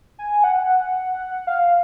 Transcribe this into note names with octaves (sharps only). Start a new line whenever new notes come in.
G#5
F#5
F5